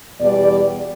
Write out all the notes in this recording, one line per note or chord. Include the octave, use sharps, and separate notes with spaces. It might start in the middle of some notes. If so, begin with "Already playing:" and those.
E2 B2 G3 D5